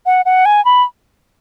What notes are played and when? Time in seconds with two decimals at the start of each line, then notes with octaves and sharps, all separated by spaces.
0.06 F#5
0.25 F#5
0.45 G#5
0.65 B5